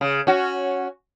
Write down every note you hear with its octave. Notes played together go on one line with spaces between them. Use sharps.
C#3
C#4 F#4